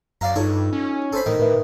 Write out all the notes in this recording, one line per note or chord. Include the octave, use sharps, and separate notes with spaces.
F#2 D5 F5 A#5
G2 D#4 F4 A4 C#5
C#4
A4 C5 B5
A2 D#3
A2 A#4 B4 E5